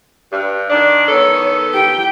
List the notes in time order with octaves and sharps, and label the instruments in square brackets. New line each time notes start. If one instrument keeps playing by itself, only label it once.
[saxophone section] G2
D#3 D4
[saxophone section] D#3 B3 A4 [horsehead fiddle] C#5
[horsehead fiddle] G4 G5